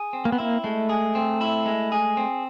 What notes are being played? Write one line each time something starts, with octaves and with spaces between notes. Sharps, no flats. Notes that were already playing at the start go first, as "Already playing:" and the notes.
Already playing: G#4
C4
A#3
B3
A#3 E4
G#3 A3
G#4
C4
E4
G#3
G#4
C4